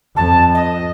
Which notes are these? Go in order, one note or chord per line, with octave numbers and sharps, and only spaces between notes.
F2 A5
D#5